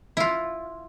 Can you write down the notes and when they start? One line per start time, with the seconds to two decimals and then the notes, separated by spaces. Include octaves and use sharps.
0.17 E4 F4